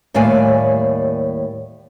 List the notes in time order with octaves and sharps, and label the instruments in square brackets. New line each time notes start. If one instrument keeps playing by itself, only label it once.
[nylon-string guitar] D#2 A2 G3 A#3 D5 G#5